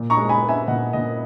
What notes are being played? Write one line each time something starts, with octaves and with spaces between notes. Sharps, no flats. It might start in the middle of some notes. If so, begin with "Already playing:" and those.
Already playing: A#2
A#5 C#6
G#3
G#5 B5
B3
E5 G#5
A#2 D#5 F#5
A#2 D#5